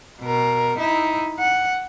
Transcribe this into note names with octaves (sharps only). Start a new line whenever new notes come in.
B2 A#4
D#4 E4
F#5